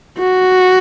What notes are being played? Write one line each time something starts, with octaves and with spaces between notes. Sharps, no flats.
F#4